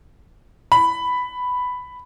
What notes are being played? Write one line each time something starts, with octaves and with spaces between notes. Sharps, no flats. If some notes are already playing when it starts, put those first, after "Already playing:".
B5